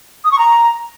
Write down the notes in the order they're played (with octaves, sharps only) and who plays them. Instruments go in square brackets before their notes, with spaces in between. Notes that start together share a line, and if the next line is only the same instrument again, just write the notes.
[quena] D#6
C#6
A#5